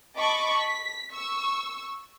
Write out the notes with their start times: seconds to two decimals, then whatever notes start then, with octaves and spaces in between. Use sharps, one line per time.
0.17 D#5 A5 B5 C#6 D6
0.60 B6
1.12 C#6 E6